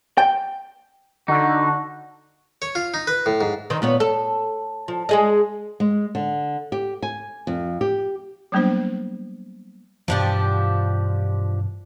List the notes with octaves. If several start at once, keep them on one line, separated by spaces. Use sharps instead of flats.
G5
D3 D#4 F#4
C#5
F4
D#4
B4
A2
G#2
D#3 C4 D#4
A#2 B3 C#5
A4
F3
G#3 G#4 D#5
G#3
D3
G4
G#5
F2
G4
F#3 G3 A#3 B3 D4 C5
G2 B2 E3 F3 D4 G4